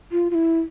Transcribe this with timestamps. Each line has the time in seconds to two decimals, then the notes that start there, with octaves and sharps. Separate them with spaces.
0.12 F4
0.31 F4
0.35 E4